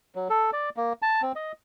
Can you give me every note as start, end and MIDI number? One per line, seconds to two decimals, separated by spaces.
0.15 0.28 54
0.29 0.50 69
0.53 0.70 74
0.77 0.93 58
1.02 1.22 81
1.22 1.32 60
1.36 1.52 75